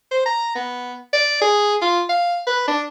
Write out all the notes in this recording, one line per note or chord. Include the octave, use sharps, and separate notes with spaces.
C5
A#5
B3
D5
G#4
F4
F5
B4
D4